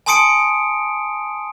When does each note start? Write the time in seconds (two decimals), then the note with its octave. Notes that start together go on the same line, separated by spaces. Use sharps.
0.06 G#5 A5 C6 D#6 C#7 D7